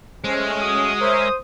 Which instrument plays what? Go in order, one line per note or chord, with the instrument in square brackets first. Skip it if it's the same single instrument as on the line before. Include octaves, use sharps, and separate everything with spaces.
[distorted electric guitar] G#3 [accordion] A3 C#4 [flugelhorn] C5
[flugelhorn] F#4 [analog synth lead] D#6
[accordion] A#4 C#5 E5 [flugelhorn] C5